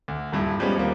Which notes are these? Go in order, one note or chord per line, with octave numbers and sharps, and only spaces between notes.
D2
D#1 G2 E4
F3 G3 G#3 B3 C#4
D#2 F3 G3 A#3